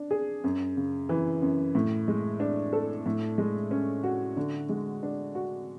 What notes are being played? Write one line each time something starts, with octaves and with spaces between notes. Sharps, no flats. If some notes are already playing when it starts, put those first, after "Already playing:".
Already playing: D4
G#4
F#2
C#3
E3
F#2
A2
G#3
D4
A4
A2
G#3
C#4
F#4
D3
G#3
D4
F#4